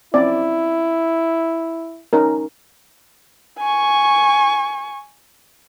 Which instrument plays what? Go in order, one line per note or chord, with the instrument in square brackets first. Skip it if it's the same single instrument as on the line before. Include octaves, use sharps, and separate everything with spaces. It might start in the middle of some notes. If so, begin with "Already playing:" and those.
[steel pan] C4 C#4 D5 [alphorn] E4
[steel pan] C#4 D#4 A#4
[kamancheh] G#5 C#6